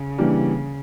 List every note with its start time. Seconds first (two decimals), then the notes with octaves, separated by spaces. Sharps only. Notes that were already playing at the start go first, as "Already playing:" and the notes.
Already playing: C#3
0.18 E3 G3 A#3 D4